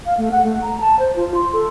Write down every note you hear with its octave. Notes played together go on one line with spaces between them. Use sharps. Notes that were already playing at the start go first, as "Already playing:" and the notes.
F5
A3
F#5
A3
A#5
A5
C5
F4
C6
A4